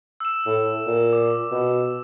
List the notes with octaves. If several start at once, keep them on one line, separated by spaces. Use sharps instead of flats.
E6 E7
A2
A#2
D6
B2